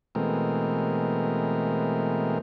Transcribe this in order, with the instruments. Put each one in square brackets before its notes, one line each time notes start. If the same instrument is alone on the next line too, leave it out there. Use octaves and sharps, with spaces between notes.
[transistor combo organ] B2 E3 G#3 A3 C4 A#4